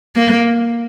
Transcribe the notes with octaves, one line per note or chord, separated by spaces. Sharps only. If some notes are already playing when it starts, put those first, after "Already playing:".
A#3